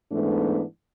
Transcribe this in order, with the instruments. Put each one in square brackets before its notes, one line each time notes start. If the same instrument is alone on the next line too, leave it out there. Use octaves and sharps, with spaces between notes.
[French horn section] G#2 E3 A3 B3 D4